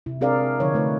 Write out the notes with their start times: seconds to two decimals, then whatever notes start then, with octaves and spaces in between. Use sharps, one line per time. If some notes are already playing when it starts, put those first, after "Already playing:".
0.06 C3 E4
0.21 C4 D4 G#4 A#4 D5 F5
0.60 D3 F3 D#4 C#5
0.74 A3 D#4 B4